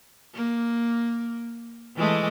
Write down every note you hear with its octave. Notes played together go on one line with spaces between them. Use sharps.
A#3
E3 G#3 A3